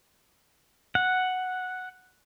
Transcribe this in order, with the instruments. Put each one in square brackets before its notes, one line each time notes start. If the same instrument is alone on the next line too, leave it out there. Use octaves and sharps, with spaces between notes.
[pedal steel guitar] F#5